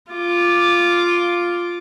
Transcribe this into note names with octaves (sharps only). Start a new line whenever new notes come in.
F4 D6